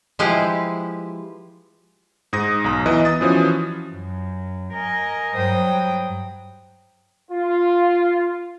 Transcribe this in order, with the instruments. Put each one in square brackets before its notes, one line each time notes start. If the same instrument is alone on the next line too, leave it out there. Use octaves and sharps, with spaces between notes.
[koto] F3 G#3 E4 G4 B4 C5
[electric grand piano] G#2 D#6 A#6
B1 A#5
E3 B3 D#5
D#6 A6
E3 F3 C#4 F#4
[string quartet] F#2
A#4 D#5 G#5
G2 F#3 C5 G5 D#6
[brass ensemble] F4